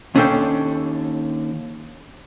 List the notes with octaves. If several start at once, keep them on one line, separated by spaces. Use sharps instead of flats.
D#2 C#4 D4 A4 C5 G5